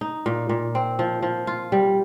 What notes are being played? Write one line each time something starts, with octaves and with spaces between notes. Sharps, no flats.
D#4
A#2
A#2
C4
F3
F3
F4
G3